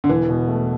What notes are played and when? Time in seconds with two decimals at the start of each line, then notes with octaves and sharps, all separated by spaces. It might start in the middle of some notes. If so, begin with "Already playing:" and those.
0.04 D3
0.09 E1 E3
0.29 B2
0.48 A3